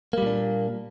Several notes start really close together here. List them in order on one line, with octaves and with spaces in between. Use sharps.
A#3 G3 A#2 D4